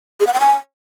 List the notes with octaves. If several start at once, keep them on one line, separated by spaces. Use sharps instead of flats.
G#4
F#5
G5
G#5